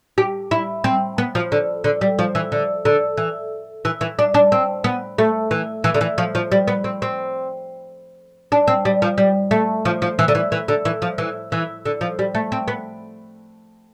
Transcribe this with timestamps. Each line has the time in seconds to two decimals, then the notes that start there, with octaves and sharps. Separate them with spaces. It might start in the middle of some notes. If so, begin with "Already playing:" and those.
0.18 G4
0.51 E4
0.84 C4
1.18 B3
1.35 F3
1.52 D3
1.84 D3
2.01 G3
2.19 F3
2.35 E3
2.52 D3
2.85 D3
3.17 E3
3.85 E3
4.01 E3
4.19 D4
4.34 D4
4.52 C4
4.84 B3
5.18 A3
5.51 E3
5.84 E3
5.94 D3
6.01 E3
6.18 F3
6.35 F3
6.52 G3
6.68 B3
6.84 C4
7.02 C4
8.52 D4
8.68 C4
8.85 G3
9.02 F3
9.18 G3
9.51 A3
9.85 F3
10.02 F3
10.19 E3
10.28 D3
10.35 E3
10.52 E3
10.68 D3
10.85 E3
11.02 F3
11.18 E3
11.52 E3
11.85 D3
12.01 F3
12.19 G3
12.35 A3
12.52 C4
12.68 B3